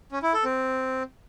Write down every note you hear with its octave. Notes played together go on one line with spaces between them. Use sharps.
C#4
E4
A4
C4